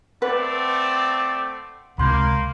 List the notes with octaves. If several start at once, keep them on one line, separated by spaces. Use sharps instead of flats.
A3 C4 B4 D5 F#5
C#2 C3 G#3 A#3 B5 C6 G6